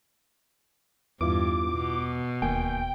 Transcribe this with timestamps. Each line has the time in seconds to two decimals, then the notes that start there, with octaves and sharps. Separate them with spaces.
1.21 E2 G2 B3 E4 F4 D6
1.72 B2
2.42 E1 D#2 A#3 G5 G#5